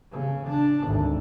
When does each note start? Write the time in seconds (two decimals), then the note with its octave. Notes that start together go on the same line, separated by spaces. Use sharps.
0.12 C#3
0.48 D4
0.84 G#1 D2